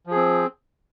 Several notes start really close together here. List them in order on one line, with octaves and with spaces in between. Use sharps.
F3 G#4 C4